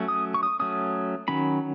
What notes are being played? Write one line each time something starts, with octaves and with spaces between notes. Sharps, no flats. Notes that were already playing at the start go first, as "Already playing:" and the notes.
Already playing: F#3 A3 C#4
D#6
C#6
D#6
F#3 A3 C#4 D#6
D#3 F#3 C#4 B5